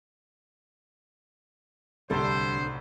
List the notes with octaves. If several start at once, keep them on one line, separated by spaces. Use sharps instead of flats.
D1 C2 D3 G3 B3 A4 C5